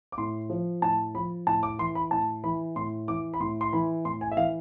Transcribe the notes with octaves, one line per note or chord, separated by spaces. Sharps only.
D6
A2 C6
F3
A2 A5
F3 B5
A2 A5
D6
E3 C6
B5
A2 A5
E3 B5
A2 C6
E3 D6
B5
A2 C6
C6
E3 B5
A2 C6
G#5
E5
E3 F5